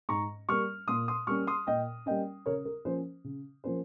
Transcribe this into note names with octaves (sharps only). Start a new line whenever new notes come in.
G#2 A#5 C#6
G3 A#3 C#6 F6
A#2 C6 D#6
C6 D#6
G3 A#3 C#4 C#6 F6
C6 D#6
A#2 D#5 G5
G3 A#3 C#4 D#5 G5
C#3 A#4 C#5
A#4
F3 A#3 C#4 C5
C#3
F3 A#3 C#4 C5